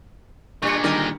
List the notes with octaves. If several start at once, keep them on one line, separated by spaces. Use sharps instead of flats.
A#2 G3 G#3 D4 C#6 C#7
D3 D#3 G3 A#4 D5 D#5